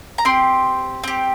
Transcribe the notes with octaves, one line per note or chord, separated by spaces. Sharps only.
A#5
C4 G4 C6
C4 G4